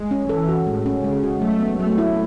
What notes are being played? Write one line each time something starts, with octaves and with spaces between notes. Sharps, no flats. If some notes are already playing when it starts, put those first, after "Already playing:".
Already playing: G#3
C#4
E3 A4
F#4
A2 G#3
C#4
C#3 G#3
F#4
F#3 A3
B3
F#3 A3
E4